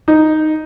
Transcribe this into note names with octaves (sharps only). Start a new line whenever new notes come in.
D#4